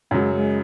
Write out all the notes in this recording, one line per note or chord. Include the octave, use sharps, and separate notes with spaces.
F#2 C#3 F#3 G#3
G#3